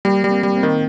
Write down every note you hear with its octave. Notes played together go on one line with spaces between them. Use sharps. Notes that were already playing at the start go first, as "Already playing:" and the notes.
G3 A#3
G3
A#3 C4
G3
A#3 C4
D#3